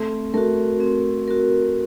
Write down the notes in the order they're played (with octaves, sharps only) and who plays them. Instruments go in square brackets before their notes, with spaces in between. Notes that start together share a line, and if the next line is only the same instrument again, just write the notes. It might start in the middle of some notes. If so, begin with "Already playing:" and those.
Already playing: [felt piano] A3 [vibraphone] C4
[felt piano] A3 [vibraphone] F#4 A#4
[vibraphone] C4
F#4 A#4